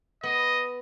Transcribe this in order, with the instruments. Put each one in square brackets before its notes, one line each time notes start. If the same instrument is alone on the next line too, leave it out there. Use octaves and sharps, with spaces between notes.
[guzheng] B3 [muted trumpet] D#5